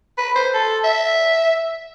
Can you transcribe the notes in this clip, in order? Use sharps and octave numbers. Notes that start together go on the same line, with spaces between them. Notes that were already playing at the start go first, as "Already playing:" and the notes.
B4
C5
A4
E5